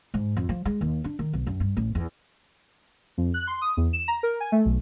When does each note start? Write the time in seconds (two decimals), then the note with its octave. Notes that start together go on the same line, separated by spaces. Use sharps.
0.14 G#2
0.37 F2
0.49 F3
0.65 G#3
0.81 D#2
1.04 D4
1.19 D#3
1.33 B1
1.47 F#2
1.60 G2
1.77 A1
1.95 E2
3.18 F2
3.34 F#6
3.47 C6
3.62 D#6
3.77 E2
3.93 E7
4.08 A#5
4.23 A#4
4.40 G#5
4.52 A3
4.65 B1